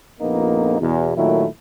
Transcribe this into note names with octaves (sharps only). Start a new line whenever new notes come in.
A#1 F2 A#3 B3 D#4
E2 B2
A#2 D#3 F#3 A3 E4